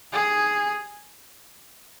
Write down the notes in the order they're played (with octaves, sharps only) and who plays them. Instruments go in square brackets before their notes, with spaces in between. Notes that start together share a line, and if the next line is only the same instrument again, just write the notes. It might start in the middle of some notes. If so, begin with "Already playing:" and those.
[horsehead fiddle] G#4